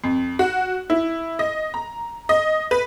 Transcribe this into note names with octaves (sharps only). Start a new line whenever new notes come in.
F2
F#4
E4
D#5
A#5
D#5
B4